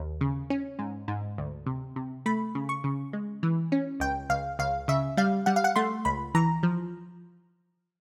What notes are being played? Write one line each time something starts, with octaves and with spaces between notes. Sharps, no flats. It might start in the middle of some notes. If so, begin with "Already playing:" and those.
Already playing: D#2
C#3
C#4
G#2
G#2
D2
C3
C3
A3 B5
C#3
C#6
C#3
G#3
E3
C#4
C#2 G5
C#2 F5
C#2 F5
C#3 E5
G3 F5
G3 F#5
F5
F#5
A3 C6
C#2 B5
E3 A#5
F3